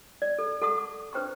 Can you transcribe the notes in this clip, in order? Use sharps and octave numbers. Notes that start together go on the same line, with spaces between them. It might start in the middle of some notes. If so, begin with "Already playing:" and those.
D5
A4
A4 F#5 A5 C#6 D#6
D6
D4 B4 C5 G5 A#5 C#6